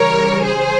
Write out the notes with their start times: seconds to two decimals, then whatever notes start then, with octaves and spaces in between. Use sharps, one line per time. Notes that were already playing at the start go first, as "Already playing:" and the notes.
Already playing: C#3 E3 G3 A#4 C#5
0.43 G#4 C5